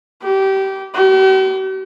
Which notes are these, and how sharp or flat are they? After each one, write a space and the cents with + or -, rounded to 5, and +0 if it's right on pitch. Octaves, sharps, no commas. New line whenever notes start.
G4 -20
G4 -45